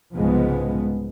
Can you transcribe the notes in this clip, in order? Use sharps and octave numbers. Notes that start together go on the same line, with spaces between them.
C2 G#2 C#3 F3 G#3 B3